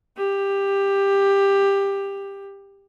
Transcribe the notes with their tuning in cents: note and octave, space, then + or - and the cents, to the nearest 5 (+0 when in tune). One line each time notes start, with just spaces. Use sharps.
G4 +15